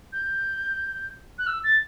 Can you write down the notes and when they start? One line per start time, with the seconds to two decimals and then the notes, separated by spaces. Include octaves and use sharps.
0.13 G6
1.39 F#6
1.47 E6
1.64 A6